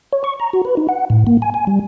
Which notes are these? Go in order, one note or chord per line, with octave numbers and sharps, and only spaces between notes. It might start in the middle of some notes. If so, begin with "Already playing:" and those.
C#5
C#6
A#5
F#4
B4
D#4
F#5
A2
A#3
G#5
G#5
G3